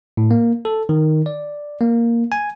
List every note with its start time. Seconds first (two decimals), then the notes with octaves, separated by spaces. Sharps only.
0.17 A2
0.31 A#3
0.65 A4
0.89 D#3
1.26 D5
1.81 A#3
2.32 G#5